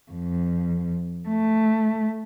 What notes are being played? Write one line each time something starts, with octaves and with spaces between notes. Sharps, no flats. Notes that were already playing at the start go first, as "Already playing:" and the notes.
F2
A3